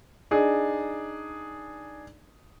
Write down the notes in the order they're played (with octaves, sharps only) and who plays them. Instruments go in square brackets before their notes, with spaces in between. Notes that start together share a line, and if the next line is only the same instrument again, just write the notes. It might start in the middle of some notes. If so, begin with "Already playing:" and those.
[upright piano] D4 D#4 G#4